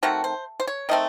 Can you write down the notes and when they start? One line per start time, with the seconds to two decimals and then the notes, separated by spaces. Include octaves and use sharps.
0.03 D#3 A3 C4 F#4
0.24 C5
0.60 C5
0.67 C#5
0.89 D#3 A3 C4 D#5